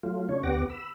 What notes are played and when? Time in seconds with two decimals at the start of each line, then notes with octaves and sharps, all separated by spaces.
0.03 F#3 A3 F4
0.29 C#3 D4 C#5
0.43 D2 B3 G4 F#5 D6 A#6
0.69 B5 E6